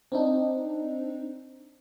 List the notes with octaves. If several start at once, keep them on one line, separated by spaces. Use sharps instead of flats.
C4 D4 D#4